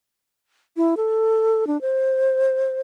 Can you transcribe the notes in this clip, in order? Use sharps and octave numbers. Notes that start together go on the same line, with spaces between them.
E4
A4
D4
C5